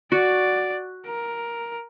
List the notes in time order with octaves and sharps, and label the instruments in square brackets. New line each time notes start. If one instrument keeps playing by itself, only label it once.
[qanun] F#4 [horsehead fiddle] D5
[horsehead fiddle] A#4